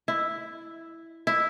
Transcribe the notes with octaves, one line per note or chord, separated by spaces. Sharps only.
E4
E4